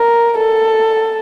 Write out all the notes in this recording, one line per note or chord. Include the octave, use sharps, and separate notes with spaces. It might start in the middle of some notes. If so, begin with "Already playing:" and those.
Already playing: A#4
A4